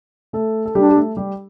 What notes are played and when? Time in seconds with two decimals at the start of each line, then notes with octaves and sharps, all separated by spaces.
0.33 A3 A4
0.66 A4
0.75 G3 D4 G4
0.89 G4
0.96 A3 A4
1.17 G3 G4